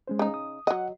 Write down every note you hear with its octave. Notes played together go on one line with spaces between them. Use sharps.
G#3 C#4 C5
C#3 D#4
D#6
F#3 D#5 F#5